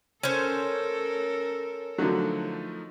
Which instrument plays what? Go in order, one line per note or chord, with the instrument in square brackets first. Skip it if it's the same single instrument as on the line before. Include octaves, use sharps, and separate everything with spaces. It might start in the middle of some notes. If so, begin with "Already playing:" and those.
[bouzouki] C#4 C5 [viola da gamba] A4 A#4
[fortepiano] D3 F#3 [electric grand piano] F3 A3 D#4